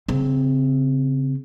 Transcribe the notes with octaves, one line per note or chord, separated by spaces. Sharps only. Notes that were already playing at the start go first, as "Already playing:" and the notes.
C#3 C4